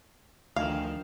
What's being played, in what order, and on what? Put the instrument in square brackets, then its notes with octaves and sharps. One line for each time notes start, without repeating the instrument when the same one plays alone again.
[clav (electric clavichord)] D2 D#5 G#5 [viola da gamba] D3 D#3 F3 [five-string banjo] F5